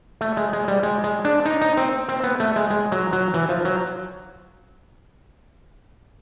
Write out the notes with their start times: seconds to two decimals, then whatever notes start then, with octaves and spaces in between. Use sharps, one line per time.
0.21 A3
0.37 G#3
0.53 G#3
0.68 G3
0.83 G#3
1.04 G#3
1.25 D4
1.45 D#4
1.62 D#4
1.77 C4
2.09 C4
2.24 B3
2.40 A3
2.56 G#3
2.70 G#3
2.92 F#3
3.13 F#3
3.34 E3
3.49 F3
3.65 F#3